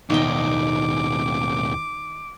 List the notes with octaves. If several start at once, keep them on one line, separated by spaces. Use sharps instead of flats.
D#2 B2 D#3 D#5 G5 D6